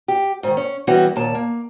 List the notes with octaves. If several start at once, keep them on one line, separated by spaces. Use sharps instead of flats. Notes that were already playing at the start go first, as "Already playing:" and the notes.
G4
G#2 D#3
C#4
E3 G3 B3 C#4 F#4 G4
D#2 A#2 A5
A#3